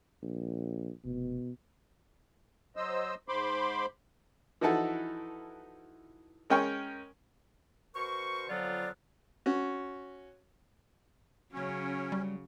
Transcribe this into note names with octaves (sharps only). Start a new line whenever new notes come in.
A#1
F1 B2
F#3 C5 D#5 E6
G#2 C5 B5 C6 D6
E3 F3 D#4 E4 F#4 A4
G#3 C#4 A#4 G5 G#5 C#6
B2 A#4 C5 C#6
F2 D3 F#3 B3 F4 D5
C#4 F#4
C#3 F#3 C#4
G3